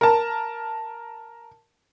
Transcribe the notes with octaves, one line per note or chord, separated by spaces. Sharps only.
A#4 A5